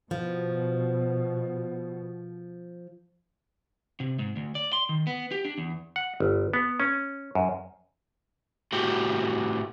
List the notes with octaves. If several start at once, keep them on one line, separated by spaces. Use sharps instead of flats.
B2 F3
C3
G#2
D2
D5
C6
D#3
B3
G4
D4
E2
F#5
G1
B3
C#4
F#2
A2 F#4 G4